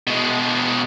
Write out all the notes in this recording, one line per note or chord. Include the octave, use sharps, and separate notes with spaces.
B2 G#3